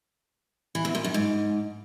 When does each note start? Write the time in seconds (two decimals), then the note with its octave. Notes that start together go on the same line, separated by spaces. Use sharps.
0.75 E3
0.85 E2
0.95 A#2
1.04 F#2
1.14 G#2